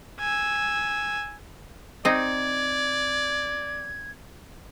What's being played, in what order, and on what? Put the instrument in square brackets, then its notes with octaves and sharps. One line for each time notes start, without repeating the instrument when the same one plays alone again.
[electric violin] G#5 E6
[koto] C4 D#4 [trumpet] D5 [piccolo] G#6